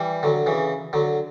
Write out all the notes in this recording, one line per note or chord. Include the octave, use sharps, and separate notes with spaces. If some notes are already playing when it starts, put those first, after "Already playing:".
Already playing: E3 G3
D3 F#3
C#3 E3
D3 F#3